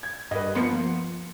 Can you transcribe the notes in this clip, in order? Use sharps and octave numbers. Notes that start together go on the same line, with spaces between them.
G#6
G2 B4 D#5
F3 A#3 B3 C6 C#7